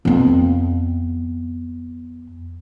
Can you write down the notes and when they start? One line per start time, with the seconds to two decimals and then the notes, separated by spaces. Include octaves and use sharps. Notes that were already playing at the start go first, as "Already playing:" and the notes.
0.05 F2 B3